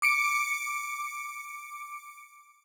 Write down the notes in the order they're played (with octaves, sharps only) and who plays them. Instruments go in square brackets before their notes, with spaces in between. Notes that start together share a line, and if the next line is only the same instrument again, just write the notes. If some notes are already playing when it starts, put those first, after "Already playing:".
[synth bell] D6 C#7 D7